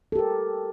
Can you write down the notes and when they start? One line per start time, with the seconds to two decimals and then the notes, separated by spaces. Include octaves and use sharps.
0.12 A4
0.15 G4
0.19 A#4